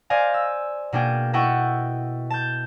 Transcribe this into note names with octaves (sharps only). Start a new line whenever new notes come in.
C5 D5 D#5 F5 G#5
E6
B2 A#3 D4 G#4 G5
E4 A4 D#5 F#5 G5 C#6
A5 G6